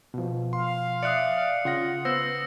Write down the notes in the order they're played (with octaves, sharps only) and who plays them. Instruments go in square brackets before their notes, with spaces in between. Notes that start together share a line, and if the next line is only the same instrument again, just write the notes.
[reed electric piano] B2 F3
[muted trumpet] F5 [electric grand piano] C6
[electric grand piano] D5 E5 F#6 [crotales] D#6 C#7
[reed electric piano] C#3 [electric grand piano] F4 F#5 A#6
[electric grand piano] B3 C5 [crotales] E6 A#6